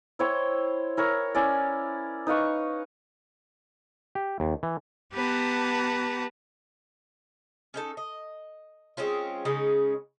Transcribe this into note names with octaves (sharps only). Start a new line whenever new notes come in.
E4 C5 C#5 G5
E4 A#4 C#5
C#4 E4 D5
D#4 B4 F5 C#6
G4
D#2
E3
B3 G4 B4 F#5 A5 A#5
C#4 D#4 A4
D#5
G#3 C4 C#4 F4
C#3 G#3 C#4 D#4